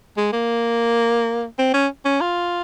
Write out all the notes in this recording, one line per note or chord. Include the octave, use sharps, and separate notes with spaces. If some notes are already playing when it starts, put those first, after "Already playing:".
G#3
A#3
C4
C#4
C#4
F4